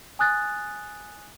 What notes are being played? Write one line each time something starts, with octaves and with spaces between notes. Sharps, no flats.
G#5 D#6 F#6 A6